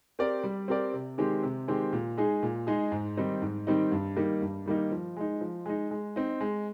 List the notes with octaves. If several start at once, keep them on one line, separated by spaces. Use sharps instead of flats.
C4 G4 A#4 D5
G3
C4 G4 A#4 D5
C3
D#3 G#3 C4 G4
C3
D#3 G#3 C4 G4
A#2
G#3 D#4 G#4
A#2
G#3 D#4 G#4
G#2
D#3 G3 C4 D#4
G#2
D#3 G3 C4 D#4
G2
D#3 G3 A#3 D#4
G2
D#3 G3 A#3 D#4
F3
G#3 D#4
F3
G#3 D#4
G#3
C4 D#4
G#3